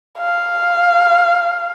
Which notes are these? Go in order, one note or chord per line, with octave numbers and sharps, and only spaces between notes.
F5